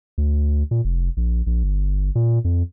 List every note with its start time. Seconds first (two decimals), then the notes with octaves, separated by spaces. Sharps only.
0.18 D2
0.71 A#2
0.85 F1
1.17 A#1
1.46 A#1
1.64 G1
2.15 A#2
2.45 F2